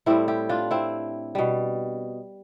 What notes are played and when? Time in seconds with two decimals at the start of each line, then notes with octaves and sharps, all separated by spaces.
0.06 A2 G3 C4 E4
0.28 E4 G4
0.49 D4 F4
0.71 C4 E4
1.35 B2 G3